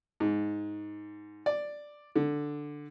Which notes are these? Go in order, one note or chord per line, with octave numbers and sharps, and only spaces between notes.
G#2
D5
D3